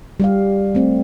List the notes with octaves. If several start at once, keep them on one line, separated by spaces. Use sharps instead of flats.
G3 G4 F5
A3 C4